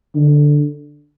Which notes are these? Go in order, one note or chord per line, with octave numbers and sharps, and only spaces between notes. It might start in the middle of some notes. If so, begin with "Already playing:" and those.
D3